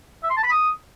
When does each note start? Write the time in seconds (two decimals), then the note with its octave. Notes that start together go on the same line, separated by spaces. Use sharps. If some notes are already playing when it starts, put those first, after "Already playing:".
0.23 E5
0.30 C6
0.37 A5
0.43 B5
0.50 D#6